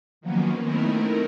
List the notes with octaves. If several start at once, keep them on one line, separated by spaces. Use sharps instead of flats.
D#3 F3 F#3 A#3 B3 C#4
A3 B3 C4 D#4 E4 A#4